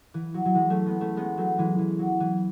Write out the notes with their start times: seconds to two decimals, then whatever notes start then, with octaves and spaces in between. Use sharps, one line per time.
0.14 E3
0.34 F#3
0.45 F#3
0.54 E3 G#3
0.70 A3 C#4
0.86 G#3 B3
1.01 A3 C#4
1.17 G#3 B3
1.38 F#3 A3
1.58 E3 G#3
1.79 E3
1.99 F#3
2.20 E3